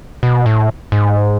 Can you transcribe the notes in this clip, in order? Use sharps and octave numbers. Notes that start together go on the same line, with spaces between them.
B2
A2
G#2